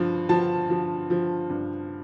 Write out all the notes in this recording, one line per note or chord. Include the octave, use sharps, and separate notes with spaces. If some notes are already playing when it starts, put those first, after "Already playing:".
Already playing: G2 F3
F3 A5
F3
F3
G2